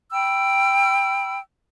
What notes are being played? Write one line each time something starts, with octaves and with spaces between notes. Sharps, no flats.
G5 B5 E6